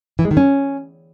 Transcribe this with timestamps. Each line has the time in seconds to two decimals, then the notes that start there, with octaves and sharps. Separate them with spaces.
0.19 E3
0.25 G#3
0.31 D#3
0.37 C#4